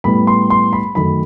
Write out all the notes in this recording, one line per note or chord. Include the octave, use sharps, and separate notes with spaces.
A2 G3 B3 B5
C6
C6
B5
F#2 D#3 A3 B5